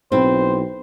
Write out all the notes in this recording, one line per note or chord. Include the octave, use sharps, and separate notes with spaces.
B1 C4 E4 C5